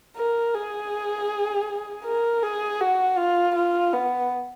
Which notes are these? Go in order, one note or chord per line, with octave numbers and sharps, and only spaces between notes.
A#4
G#4
A#4
G#4
F#4
F4
F4
B3